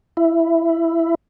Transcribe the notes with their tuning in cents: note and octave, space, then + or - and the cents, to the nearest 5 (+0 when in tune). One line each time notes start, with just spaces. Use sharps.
E4 +10